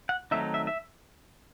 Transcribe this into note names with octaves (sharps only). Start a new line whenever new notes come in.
F#5
D#3 F#3 A3 C4 D#4 E5
E5
E5